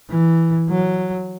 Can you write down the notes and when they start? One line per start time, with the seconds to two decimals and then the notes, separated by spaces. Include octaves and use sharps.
0.10 E3
0.70 F#3